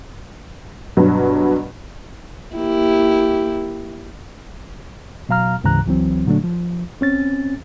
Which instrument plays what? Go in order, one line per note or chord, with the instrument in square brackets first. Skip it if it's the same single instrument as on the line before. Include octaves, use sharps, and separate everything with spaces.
[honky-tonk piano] G2 B2 F#3
[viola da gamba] A#3 E4 G4
[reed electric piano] B2 F#3 F5 A#5 F6
D2 G#2 C#3 E3 A#5 F#6
C#2 E3 F#3 C4
A#2 D3 F#3 A3 D4
F3
C4 C#4 A6